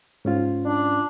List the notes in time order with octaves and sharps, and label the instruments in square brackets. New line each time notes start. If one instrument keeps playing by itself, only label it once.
[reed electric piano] G#2 C#4 F4
[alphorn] D4